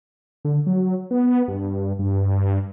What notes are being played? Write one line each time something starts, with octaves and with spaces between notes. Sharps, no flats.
D3
F#3
B3
G2
G2